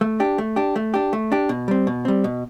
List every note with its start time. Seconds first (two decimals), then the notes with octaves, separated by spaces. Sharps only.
0.01 A3
0.20 D4 G4
0.38 A3
0.56 D4 G4
0.76 A3
0.94 D4 G4
1.13 A3
1.32 D4 G4
1.49 B2
1.68 G3 C4
1.87 B2
2.05 G3 C4
2.24 B2